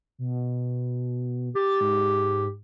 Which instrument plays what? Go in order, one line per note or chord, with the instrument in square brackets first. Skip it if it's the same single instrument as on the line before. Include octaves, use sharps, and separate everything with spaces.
[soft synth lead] B2
[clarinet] G4 [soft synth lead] A6
[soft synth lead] G#2